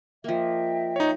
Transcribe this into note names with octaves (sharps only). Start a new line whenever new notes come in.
F3 A#3 D#5 E5 G5
D#4 C#5